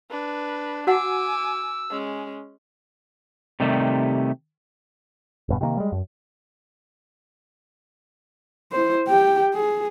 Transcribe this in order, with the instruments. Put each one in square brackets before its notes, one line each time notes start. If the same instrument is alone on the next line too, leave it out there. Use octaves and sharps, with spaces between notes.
[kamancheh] D4 B4
[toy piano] F#4 F#5 [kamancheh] G#5 D6 [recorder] E6
[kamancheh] G#3 C#4
[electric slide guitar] C3 D#3 G3 A3
[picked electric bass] E1 G2 B2
C3 D#3 A3 A#3
G3 G#3
F#2
[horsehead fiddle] E4 C5
G4 G5
G#4